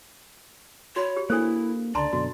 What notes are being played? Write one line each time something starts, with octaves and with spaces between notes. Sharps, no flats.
F#4 C#5 B5
G4
A#3 D4 E4 A4 C5
C#2 D3 D5 A5 A#5 C6
F#2 B2 D3 F#4